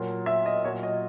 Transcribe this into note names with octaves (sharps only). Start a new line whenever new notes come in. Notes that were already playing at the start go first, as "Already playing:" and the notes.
Already playing: A#2 F#3
E5
D#5
A#2 F#3 C#5
D#5